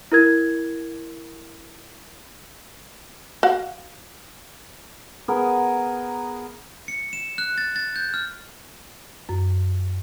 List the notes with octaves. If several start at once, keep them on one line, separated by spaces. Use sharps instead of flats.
E4 A#4 G#6
F#4 F5 F#5
B3 G#4 A#4
C#7
E7
F#6
A6
A6
G6
F6
F#2